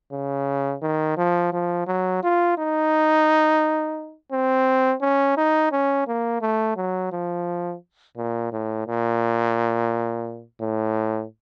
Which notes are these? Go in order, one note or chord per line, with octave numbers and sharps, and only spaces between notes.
C#3
D#3
F3
F3
F#3
F4
D#4
C4
C#4
D#4
C#4
A#3
A3
F#3
F3
A#2
A2
A#2
A2